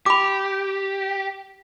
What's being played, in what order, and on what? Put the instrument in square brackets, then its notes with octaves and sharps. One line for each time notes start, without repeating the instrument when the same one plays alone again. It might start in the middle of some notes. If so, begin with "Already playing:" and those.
[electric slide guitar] G4 [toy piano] B5 D6